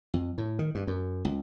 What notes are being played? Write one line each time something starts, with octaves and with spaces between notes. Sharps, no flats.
F2
A2
D#3
G2
F#2
C#2